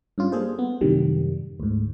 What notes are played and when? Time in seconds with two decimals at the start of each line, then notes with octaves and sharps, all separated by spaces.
0.18 G2 C#4 F4
0.32 G3 A#3 G#4 A4 C5
0.59 B3
0.81 F#2 A2 C3 D#3 G3
1.60 D2 G#2